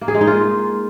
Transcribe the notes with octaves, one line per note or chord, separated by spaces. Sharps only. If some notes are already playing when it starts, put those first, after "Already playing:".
A#3
G#4
G#3
D#4
F4